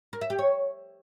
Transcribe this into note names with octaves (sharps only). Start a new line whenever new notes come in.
A#4
E5
G4
C#5